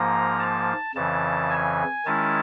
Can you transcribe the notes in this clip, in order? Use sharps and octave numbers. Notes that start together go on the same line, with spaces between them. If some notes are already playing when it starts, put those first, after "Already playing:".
Already playing: G#2 F3 A#3 A#5
A5
F2 C#3 E3 A5
G#5
D#3 G#3 C#4 E4 A5